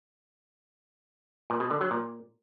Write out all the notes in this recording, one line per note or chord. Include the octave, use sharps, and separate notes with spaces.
A#2
B2
D3
F#3
A#2